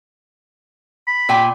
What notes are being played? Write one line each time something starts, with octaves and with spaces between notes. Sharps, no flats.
B5
A#2 G5 G#5